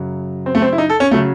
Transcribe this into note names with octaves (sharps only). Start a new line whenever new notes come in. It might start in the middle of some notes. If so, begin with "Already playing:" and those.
Already playing: F#2 C#3 F#3
C4
A3
C4
E4
D#4
A4
C#4
C#3 F#3 A3